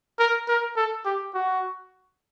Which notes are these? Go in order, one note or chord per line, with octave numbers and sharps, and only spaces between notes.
A#4
A#4
A4
G4
F#4